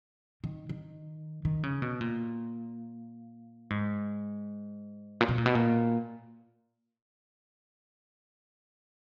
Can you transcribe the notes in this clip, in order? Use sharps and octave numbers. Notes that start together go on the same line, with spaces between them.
D#3
D#3
D#3
C#3
B2
A#2
G#2
A#2
B2
A#2
B2
A#2